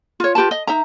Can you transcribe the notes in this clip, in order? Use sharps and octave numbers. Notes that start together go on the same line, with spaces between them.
F4 C#5
F4 G4 B4 A5
D#5
D#4 E5 A#5